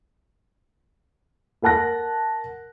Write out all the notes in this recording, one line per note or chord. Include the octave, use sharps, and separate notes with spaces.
A#4 F#5 A5 F#6 A#6